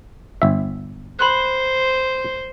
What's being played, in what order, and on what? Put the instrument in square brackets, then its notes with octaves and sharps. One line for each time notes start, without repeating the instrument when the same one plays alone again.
[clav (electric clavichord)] G1 E5
[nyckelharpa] C5 [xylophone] B5 C6 F#6